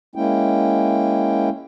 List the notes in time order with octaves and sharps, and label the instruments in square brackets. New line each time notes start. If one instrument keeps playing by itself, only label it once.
[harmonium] G#3 A#3 C#4 E4 G5